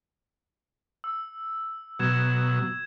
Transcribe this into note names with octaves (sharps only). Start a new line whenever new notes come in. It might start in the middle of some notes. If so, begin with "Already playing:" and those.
E6
B2 F#3 E6 G#6 E7